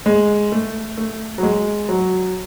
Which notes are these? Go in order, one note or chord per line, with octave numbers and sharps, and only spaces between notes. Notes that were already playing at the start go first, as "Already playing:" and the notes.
G#3
A3
A3
F#3
G#3
F#3